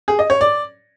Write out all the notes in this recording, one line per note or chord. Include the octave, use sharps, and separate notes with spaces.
G#4
D#5
C#5
D5